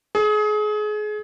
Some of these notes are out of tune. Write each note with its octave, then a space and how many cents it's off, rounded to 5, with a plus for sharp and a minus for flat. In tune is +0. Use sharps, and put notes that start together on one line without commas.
G#4 +30